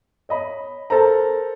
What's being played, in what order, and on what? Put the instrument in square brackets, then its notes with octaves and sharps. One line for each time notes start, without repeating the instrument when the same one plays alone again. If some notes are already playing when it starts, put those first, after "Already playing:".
[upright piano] C#5 D#5 B5
A4 A#4 C5 A#5